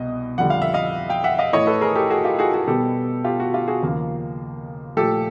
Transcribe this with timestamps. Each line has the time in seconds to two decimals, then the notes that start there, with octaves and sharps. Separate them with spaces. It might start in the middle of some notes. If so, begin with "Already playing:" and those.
Already playing: C2 B2 D#5
0.38 F2 D3 G3 F#5
0.50 F5
0.62 E5
0.74 D#5 F5
1.10 F5 G5
1.24 E5 F#5
1.39 D#5 F5
1.53 A2 E3 A3 C#5 D#5
1.67 A4 B4
1.81 G#4 A#4
1.96 G4 A4
2.10 F#4 G#4
2.24 F4 G4
2.39 F#4 G#4
2.54 F#4 G#4
2.67 B2 G3 B3 G4 A4
3.24 F4 G4
3.40 F#4
3.53 F4 G4
3.68 F#4 G#4
3.82 D#2 C#3 F3 A#3
4.96 A#2 F3 A3 G4 A4